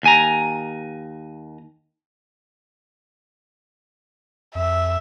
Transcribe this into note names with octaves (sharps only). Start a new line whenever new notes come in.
D#2 G#5 A#5
F2 E5